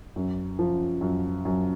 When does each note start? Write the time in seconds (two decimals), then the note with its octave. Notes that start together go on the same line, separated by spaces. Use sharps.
0.16 F#2
0.59 F3
1.01 F#2
1.45 F#2